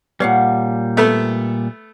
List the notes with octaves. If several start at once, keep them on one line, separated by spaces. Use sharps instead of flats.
A#2 G3 C#5 F5 F#5
A3 B3 A4